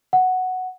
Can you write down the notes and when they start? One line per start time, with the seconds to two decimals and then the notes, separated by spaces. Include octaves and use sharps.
0.13 F#5